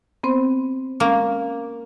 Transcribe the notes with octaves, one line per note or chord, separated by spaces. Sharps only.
B3 C4 C5
G#3 A#3 C#4